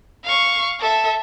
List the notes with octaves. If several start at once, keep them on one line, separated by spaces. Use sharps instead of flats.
F5 C#6
A4 E5